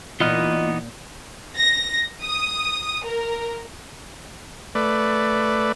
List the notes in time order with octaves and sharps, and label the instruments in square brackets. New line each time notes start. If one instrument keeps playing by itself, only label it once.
[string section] A#2 [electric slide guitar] E3 D#4 [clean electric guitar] B3 [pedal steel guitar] F4 D#5 F6
[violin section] A#6
D#6
A#4
[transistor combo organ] A3 B4 D5